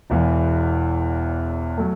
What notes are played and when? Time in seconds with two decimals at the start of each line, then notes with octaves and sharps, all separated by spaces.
0.10 E1 E2 E3
1.78 F#3 A3